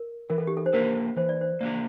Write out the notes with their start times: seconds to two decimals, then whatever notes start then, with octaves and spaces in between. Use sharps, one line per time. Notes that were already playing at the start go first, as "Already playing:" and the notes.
Already playing: A#4
0.30 E3 A#4
0.38 A4
0.47 G4
0.57 A4
0.66 C5
0.73 A#3 D4 G4 A#4
1.17 E3 C5
1.29 D5
1.41 C5
1.60 A#3 D4 G4 D5